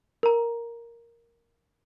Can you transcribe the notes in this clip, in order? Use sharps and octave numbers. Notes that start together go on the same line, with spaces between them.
A#4 A#5